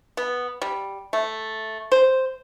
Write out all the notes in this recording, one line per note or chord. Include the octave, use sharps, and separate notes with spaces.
B3
G3
A3
C5